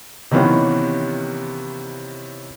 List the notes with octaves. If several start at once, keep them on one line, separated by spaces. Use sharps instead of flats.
C3 D#3 E3 B3 C#4 F4